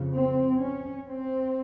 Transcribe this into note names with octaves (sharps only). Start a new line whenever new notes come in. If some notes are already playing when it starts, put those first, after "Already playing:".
Already playing: F2 C#3
C4
C#4
C4